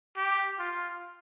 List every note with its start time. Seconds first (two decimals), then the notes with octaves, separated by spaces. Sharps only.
0.17 G4
0.59 F4